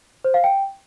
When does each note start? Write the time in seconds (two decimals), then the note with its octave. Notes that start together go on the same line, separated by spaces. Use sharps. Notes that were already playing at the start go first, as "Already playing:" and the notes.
0.24 C5
0.34 F5
0.44 G5